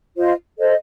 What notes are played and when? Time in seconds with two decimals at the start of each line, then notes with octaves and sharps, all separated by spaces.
0.17 F4 C5 D#5
0.59 A4 C5 D#5